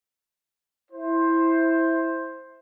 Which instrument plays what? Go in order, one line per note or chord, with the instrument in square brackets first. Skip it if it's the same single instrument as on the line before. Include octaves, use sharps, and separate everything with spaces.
[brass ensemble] E4 C5